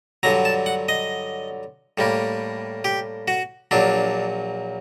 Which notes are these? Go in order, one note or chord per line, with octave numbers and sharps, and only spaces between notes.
G2 D3 F#3 A#5
A5
F#5
D#5
A2 G3 A#3
G4
F#4
A#1 A#2 F#3 D4